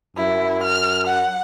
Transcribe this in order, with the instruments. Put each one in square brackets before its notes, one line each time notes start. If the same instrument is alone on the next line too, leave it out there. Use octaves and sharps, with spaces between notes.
[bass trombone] F#2 [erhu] E4
[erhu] F6
F#5